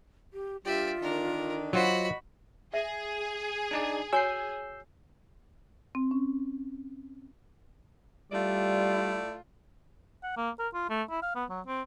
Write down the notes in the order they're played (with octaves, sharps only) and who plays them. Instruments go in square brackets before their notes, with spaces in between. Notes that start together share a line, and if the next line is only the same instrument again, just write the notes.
[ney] G4
[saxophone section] G2 G3 G4 [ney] F4 [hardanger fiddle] D5 E5
[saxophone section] D3 D#3 D4 [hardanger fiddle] A#4
[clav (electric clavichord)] F#3 F4 C5 [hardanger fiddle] F#4 B5 [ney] D#5
[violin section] G#4 [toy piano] E5
[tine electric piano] D4 D#4 D5
[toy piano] F#4 C#5 G#5 [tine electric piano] E6 G6 C7
[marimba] C4
C#4
[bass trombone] G3 [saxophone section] A3 E4 D5 [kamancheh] F4
[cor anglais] F#5
A#3
A#4
F4
A3
E4
F5
B3
F#3
C4